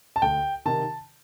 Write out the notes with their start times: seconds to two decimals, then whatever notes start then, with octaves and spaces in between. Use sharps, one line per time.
0.16 A5
0.22 D2 G5
0.66 C3 D#3 A5